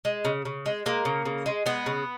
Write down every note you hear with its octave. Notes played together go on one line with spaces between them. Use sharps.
G#3
C#3
C#3
G#3
G#3 A#3
C#3
C#3
G#3
G#3 B3
C#3